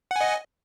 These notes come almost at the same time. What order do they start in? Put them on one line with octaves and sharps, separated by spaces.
F#5 G#5 D#5